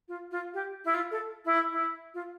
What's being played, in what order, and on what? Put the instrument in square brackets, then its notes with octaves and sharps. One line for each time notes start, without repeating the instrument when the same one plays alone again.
[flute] F4
F4
G4
E4
F4
A4
E4
E4
F4